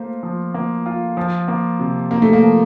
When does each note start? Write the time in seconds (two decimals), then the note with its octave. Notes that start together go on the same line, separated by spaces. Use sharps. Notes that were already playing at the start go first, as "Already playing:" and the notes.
Already playing: A3 A#3 F4 C5
0.23 F3
0.54 A#3
0.86 F4
1.17 F3
1.48 A#3
1.79 C3
2.11 C3 A#3
2.22 A3
2.33 A#3
2.42 F3